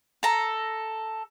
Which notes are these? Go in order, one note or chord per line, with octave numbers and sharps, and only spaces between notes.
A4 A#5